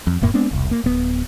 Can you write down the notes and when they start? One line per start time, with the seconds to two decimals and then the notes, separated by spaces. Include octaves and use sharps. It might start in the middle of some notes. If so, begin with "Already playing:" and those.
0.07 F2
0.21 E1 F#2 A2 A#3
0.34 G#3 B3 C4 D4
0.51 E1 C2
0.71 A#3
0.84 D1 B3